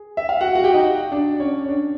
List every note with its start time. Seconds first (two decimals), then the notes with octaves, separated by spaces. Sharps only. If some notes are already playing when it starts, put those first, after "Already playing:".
Already playing: G#4
0.17 E5
0.29 F5
0.41 F#4 F#5
0.55 F#4 F#5
0.64 G4 G5
0.74 D#4 D#5
1.12 D4 D5
1.40 C#4 C#5
1.65 C#5
1.69 D4 D5